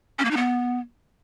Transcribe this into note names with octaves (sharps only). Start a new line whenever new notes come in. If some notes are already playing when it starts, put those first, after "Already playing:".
C#4
A#3
D#4
B3